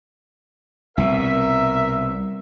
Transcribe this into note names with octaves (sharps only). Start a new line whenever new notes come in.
C2 B2 A#4 E5